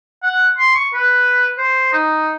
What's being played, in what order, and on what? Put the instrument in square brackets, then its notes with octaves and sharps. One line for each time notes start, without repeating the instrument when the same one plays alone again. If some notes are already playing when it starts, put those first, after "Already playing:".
[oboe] F#5
C6
C#6
B4
C5
D#4